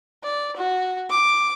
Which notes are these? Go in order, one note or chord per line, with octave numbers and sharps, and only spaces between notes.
D5
F#4
D6